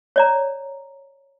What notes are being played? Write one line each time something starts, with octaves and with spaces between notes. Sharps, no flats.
C#5 D5 A#5